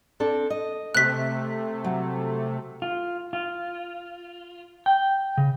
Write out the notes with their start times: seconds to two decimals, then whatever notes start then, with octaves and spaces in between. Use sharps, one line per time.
0.20 C4 D4 A4
0.50 D#5
0.95 C3 A3 F#6 B6
1.84 F#3
2.82 F4
3.33 F4
4.86 G5
5.37 C#3